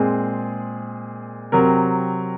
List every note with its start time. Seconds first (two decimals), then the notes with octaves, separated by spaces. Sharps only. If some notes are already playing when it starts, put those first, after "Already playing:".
Already playing: A#2 G#3 C4 G#4
1.52 C3 F#3 C4 A#4